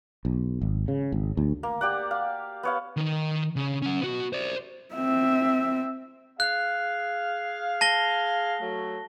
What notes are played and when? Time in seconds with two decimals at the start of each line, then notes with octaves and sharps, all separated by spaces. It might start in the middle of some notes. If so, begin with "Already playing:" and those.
0.25 B1
0.62 G#1
0.88 C#3
1.12 G#1
1.37 D2
1.63 A#3
1.81 G4 D5 F#5
2.11 F5
2.63 B3 C#5 F5
2.97 D#3 D#4
3.56 C#3
3.82 C#4 F#5
4.01 B3 F#4
4.33 C5 D5
4.94 C4 E5
6.40 G#4 F5 F#6
7.81 A5 A#6 G7
8.62 F#3 A3